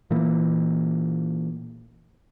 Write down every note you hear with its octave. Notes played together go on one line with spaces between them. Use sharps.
A#2 E3 A#3